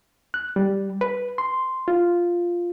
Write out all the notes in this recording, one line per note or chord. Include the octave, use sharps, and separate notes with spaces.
F#6
G3
B4
C6
F4